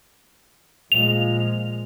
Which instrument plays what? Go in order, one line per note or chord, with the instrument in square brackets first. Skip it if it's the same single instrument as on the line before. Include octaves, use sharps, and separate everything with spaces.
[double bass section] A#2 F3 G#3 [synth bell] F7